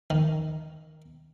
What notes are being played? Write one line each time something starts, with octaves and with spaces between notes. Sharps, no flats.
D#3